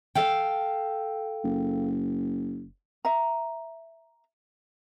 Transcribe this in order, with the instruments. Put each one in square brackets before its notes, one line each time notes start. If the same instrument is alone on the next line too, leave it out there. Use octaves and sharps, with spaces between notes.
[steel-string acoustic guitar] A4 F5 G5
[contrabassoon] F#1
[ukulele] E5 A#5